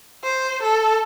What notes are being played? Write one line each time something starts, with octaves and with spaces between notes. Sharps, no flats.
C5
A4